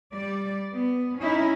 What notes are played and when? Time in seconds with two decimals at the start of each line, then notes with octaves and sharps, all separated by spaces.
0.13 G3 D5
0.74 B3
1.19 C#4 D#4 E4